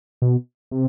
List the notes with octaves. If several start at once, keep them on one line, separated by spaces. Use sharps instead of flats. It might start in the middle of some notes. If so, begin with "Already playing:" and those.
B2
C3